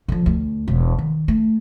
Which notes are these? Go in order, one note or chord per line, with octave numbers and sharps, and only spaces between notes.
D3 F3
D2
E1
D#3
A3